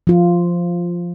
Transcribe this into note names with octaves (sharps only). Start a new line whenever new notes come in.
F3 F4